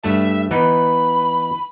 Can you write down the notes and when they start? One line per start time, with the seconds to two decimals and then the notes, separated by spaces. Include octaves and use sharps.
0.04 G2 A3 E5 A5
0.51 E3 B3 D#4 B5